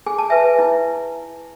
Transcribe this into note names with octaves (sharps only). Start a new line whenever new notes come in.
G#4 G#5
A5
B4 E5 G#5
E4